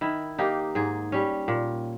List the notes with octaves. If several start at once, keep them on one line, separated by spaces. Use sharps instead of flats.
D#3 E4
A#3 D#4 G4
G#2 G#4
G3 C#4
A#2